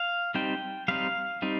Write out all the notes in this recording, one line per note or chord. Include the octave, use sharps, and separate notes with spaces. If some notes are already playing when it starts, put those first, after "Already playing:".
Already playing: F5
G3 C4 D#4 G5
G3 C4 D#4 F5
G3 C4 D#4